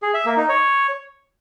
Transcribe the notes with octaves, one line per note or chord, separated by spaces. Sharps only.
G#4
E5
A#3
D#4
C#5